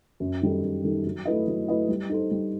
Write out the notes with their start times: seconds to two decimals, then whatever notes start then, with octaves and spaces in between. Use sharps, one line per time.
0.20 F#2
0.42 D#3 G3 D#4 A4
0.63 F#2
0.84 D#3 G3 D#4 A4
1.05 F#3
1.25 A3 E4 B4 D#5
1.47 F#3
1.68 A3 E4 B4 D#5
1.89 G3
2.09 D#4 A4 C5
2.31 G3